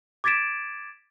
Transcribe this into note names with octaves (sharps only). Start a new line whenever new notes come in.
D6 G#6 A6 B6 D7 E7